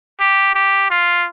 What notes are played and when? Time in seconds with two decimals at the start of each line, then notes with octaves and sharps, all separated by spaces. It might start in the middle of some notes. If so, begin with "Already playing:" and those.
0.20 G4
0.55 G4
0.91 F4